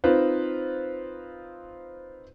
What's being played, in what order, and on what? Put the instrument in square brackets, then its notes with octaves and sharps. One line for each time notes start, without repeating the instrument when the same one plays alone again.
[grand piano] C4 D#4 F4 B4 C5